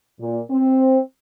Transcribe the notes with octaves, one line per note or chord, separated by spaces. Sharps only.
A#2
C4